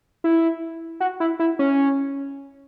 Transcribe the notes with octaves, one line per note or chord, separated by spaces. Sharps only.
E4
F#4
E4
E4
C#4